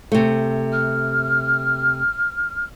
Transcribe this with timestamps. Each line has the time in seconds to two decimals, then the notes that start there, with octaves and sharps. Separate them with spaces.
0.12 C3 A3
0.72 F6